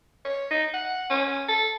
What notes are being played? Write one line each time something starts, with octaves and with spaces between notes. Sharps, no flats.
C#5
D#4
F#5
C#4
A4